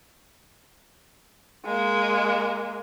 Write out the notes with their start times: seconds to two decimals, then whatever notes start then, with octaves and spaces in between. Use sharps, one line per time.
1.66 G#3 A#3